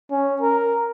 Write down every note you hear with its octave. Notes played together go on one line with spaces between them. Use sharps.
C#4
A#4